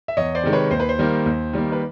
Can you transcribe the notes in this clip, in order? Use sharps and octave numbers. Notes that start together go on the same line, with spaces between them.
E5
E2 C#5 D#5
C5 D5
C3 D#3 G#3
B4 C#5
D#2 C5
B4
C5
D#3 G3 A#3
D#2
D#3 G3 A#3
B4